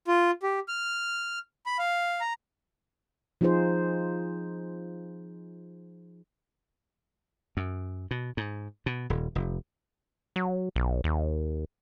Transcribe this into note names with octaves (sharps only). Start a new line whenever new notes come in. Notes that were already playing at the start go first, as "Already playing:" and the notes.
F4
G4
F6
B5
F5
A#5
F3 D#4 F4 G#4 C5
F#2
B2
G#2
B2
D#1
F1
F#3
B1
D#2